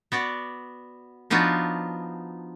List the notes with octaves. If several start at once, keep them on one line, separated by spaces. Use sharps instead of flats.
B3 F#4 D5
F3 B3 D4 D#4 F4 F#4